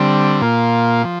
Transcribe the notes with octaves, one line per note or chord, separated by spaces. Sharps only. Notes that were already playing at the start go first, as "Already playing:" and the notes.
Already playing: D3 G3 C4
A#2 A#3 F4
F3